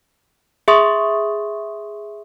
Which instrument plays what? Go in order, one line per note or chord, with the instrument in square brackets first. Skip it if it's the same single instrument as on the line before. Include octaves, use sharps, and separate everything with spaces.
[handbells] G#4 E5 C6 C#6 D#6